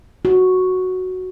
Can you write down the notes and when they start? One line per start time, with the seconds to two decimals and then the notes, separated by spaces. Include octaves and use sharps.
0.25 F#4